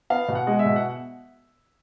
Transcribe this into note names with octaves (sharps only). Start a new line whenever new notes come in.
B3 F5
B2
F#5
G#3
E5
B2
F#5